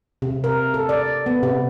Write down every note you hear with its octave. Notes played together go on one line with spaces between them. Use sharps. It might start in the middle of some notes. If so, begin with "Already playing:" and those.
C3
A#4
A4
D5
B3
C3